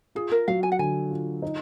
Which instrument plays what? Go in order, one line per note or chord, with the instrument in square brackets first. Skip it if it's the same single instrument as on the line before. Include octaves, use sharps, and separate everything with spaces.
[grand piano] F4 [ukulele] G#4
[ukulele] A#4
[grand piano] F#3 [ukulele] F5
[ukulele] G#5
F#5
[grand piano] D3 [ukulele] G#5
[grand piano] F4
D#4